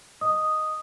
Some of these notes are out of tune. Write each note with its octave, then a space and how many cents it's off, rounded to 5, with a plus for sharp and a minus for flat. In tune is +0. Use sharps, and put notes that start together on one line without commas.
D#5 +0 D#6 +0